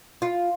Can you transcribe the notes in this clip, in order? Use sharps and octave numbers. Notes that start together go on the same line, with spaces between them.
F4